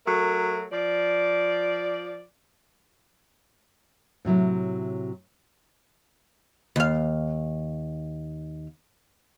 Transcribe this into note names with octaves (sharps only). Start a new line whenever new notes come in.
F#3 A3 A#4
F3 D5
A2 C3 F#3 E4
D#2 F5